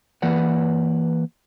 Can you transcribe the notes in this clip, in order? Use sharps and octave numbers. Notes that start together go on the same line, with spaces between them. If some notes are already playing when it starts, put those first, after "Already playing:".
E3 A#3 B4 D5 F#5